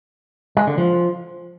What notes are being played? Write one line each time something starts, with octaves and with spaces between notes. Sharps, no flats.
G#3
D3
F3